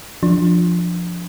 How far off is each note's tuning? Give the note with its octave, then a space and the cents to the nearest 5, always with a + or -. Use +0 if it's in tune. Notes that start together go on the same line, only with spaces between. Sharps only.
F3 +0 D4 +0